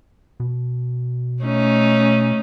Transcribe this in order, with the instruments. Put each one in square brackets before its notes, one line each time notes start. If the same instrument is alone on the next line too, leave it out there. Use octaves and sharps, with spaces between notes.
[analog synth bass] B2
[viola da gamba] A3 C#4 D#4